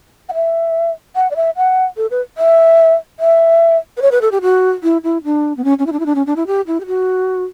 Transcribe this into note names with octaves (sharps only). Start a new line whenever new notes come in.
F#5
E5
F#5
D5
E5
F#5
A4
B4
E5
E5
B4
C#5
B4
A4
G4
F#4
E4
E4
D4
B3
C#4
C#4
E4
D4
E4
D4
C#4
D4
E4
G4
E4
G4
F#4